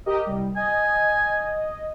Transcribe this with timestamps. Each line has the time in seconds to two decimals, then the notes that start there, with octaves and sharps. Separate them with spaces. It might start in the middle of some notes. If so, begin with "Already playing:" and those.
0.06 G4 A#4 D#5
0.26 C2 G3
0.57 D#5 G#5